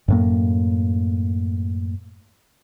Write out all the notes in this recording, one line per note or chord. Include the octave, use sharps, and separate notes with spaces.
F#2 A2 A#3